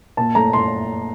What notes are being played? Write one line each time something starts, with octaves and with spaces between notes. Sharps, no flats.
A#2 A5
A3 A#5
A#2 C6